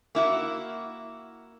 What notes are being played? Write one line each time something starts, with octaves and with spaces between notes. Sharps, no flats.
A#3 E4 F#4